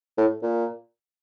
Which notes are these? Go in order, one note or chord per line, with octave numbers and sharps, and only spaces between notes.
A2
A#2